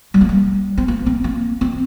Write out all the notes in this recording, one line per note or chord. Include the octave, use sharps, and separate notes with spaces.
G3
A#3
G3
C4
A#3
C4
A#3
C4